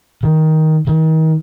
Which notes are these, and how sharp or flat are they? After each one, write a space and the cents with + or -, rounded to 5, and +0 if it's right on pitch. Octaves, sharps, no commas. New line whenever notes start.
D#3 +15
D#3 +35